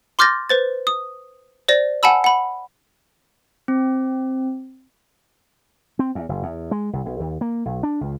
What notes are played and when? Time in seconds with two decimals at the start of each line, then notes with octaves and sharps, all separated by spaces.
0.19 C6 D6 F6 G6 A6 A#6
0.49 B4 C5 A6
0.87 D#6
1.68 C5 D5 A#6
2.03 F#5 G#5 A5 B5 E6
2.24 F#5 B5
3.68 C4
5.99 C4
6.15 E2
6.29 F#1
6.43 E2
6.71 G#3
6.93 C2
7.06 B1
7.20 D#2
7.41 A#3
7.65 B1
7.83 D4
8.01 C#2